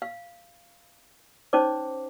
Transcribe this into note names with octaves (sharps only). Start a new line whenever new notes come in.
F5
C#4 D#4 C5 C#5 D6